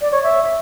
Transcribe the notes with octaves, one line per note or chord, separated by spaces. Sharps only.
D5
C#5
E5